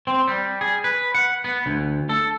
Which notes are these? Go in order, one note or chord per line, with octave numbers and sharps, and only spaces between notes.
C4
G3
G#4
B4
F#5
B3
D2
A4